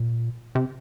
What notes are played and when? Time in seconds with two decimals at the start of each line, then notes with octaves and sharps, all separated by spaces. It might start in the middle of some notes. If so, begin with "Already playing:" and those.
Already playing: A#2
0.55 C3